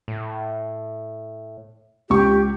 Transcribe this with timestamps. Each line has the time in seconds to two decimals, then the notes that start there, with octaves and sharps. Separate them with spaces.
0.08 A2
2.10 C#2 G4 C#6